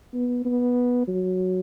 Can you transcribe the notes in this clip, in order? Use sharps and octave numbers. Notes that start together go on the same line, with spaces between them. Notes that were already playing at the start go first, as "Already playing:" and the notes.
B3
B3
F#3